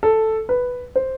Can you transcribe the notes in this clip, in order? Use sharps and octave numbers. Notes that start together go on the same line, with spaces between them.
A4
B4
C5